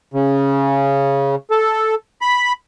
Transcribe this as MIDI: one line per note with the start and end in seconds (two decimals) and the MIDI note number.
0.14 1.35 49
1.51 1.95 69
2.21 2.52 83